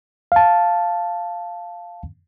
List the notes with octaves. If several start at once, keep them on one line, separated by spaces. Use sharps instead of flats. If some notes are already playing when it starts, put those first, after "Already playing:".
F5 A5